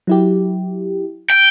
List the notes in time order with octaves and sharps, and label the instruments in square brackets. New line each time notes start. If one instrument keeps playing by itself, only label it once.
[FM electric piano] F#3 E4 G4
[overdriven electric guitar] G5